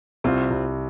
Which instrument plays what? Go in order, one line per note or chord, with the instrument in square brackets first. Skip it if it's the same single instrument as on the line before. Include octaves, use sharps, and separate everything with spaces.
[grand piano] C2 [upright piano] C4 F4
[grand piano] C2